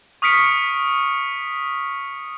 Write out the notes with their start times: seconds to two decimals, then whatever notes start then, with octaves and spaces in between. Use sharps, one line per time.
0.22 C#6 D#6 F6 B6 C#7 D7